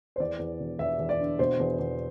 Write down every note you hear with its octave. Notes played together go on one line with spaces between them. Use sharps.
C5
E2 D5
E2
E1
E2 E5
E2
D5
D3
B2 C5
E2
E2